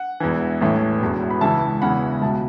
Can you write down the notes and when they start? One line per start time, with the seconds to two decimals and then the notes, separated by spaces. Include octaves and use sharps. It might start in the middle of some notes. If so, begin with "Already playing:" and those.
Already playing: F#5
0.20 E1 E2 E3
0.61 A1 A2 E3
1.01 E1 E2 B2
1.30 B5
1.41 C#2 C#3 E3 E5 A5
1.82 E1 E2 C#3 E3 F#5 B5
2.21 C#2 E5 A5
2.25 B2